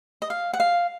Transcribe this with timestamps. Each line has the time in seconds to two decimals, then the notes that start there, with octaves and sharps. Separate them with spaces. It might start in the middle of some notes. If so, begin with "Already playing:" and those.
0.22 D#5
0.30 F5
0.53 F#5
0.60 F5